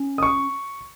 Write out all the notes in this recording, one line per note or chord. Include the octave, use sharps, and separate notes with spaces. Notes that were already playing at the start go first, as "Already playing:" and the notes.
Already playing: C#4
D#6
C#6